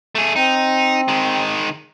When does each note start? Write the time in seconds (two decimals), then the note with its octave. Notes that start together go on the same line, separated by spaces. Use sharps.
0.15 A3 G#4
0.36 C4 D#4
1.08 D#3 G#3